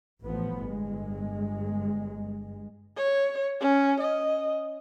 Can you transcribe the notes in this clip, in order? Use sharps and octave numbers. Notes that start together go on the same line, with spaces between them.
A1 A2 F3 B3
G1 G#3
C#5
C#4
D#5